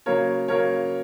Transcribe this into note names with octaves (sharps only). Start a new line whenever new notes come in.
C#3 F#3 A#3 A#4 C#5
C#3 F#3 A#3 A#4 C#5